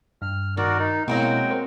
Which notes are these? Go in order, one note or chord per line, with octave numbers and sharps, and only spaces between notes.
G2 F6
D#3 F#4 A#4 D5
D#4
B2 F#3 G#3 A#3 C4 E4 G5
A#4 C5